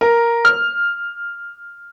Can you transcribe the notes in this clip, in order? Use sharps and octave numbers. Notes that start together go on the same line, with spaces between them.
A#4
F6